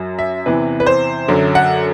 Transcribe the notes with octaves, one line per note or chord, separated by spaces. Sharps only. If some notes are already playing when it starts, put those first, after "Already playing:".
Already playing: F#2 F#3
E5
E2 C3 E3 B4
B4
C5
F#2 D3 F#3
F#5